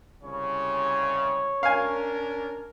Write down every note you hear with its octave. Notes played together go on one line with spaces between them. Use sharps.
C2 C#3 C#5
C#4 D4 A#4 F5 G#5